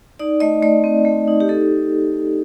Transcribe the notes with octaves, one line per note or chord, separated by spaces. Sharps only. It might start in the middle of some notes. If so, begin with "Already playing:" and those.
D#4 D5
A3 D#5
A3 D5
C4
A3
D#4
G4
D#4 A4